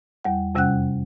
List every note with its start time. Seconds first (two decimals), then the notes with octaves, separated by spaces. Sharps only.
0.25 E2 G3 F#5
0.55 F2 C3 G3 C#4 F#5 F#6